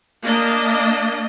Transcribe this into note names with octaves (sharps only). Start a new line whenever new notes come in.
A#3 D4 D#5